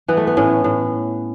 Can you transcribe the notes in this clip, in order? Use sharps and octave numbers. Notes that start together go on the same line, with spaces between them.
E3 B3
A3
B3
A2 C#4
A2